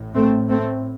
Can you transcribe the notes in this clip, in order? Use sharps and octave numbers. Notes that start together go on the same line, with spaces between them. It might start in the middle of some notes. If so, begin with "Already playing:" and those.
Already playing: A1 A2
A3 C4
A3 C4